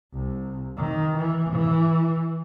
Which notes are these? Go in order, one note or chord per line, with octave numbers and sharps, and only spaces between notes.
C2
D#3
E3
E3